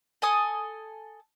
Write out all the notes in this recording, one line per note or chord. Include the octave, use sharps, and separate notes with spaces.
A4 G#5 D#6